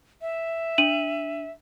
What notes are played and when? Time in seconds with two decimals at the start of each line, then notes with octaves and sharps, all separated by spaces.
0.22 E5
0.78 D4 D#7 F#7